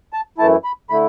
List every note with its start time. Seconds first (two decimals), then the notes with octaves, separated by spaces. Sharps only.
0.13 A5
0.38 F#2 E3 A3 E4 A5
0.64 B5
0.90 D3 A3 E4 B5